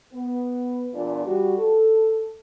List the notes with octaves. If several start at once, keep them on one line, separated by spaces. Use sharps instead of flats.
B3
E2 A#2 E3 D4 F4
G3 F#4
A4